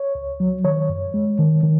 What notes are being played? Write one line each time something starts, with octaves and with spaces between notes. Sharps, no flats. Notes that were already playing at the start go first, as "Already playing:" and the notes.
Already playing: C#5
C#2
F#3
D#3 C#5
F#2
G#3
D#3
D#3